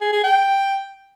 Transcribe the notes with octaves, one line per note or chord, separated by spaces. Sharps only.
G#4
G#4
G5